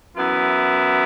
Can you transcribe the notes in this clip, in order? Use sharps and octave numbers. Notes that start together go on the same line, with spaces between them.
F#2 E3 B3 E4